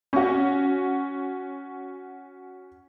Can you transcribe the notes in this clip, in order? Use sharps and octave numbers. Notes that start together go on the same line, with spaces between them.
C#4 F#4